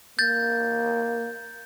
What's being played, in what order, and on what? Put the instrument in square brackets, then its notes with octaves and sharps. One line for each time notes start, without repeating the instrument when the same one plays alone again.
[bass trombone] A#3 [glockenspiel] G6 A6